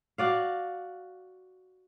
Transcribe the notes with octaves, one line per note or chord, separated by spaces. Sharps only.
F#4 D5 F5